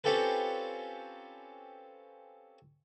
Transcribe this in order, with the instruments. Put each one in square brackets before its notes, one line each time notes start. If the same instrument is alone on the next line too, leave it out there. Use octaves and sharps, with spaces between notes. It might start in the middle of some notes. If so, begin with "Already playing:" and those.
[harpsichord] C4 C#4 F4 G4 A4 B4